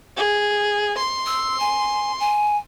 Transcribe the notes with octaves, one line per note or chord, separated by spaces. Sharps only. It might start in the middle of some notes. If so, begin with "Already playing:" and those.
G#4
C6
E6
G#5
G#5